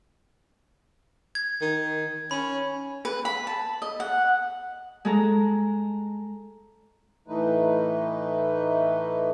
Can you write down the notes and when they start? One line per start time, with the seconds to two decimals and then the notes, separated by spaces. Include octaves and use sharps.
1.35 G#6
1.61 D#3
2.31 C#4 B5
3.05 B4
3.25 B5
3.47 A5
3.82 D#5
4.00 F#5
5.05 G#3 A4 A#5
7.28 A2 E3 A3 D#4 B4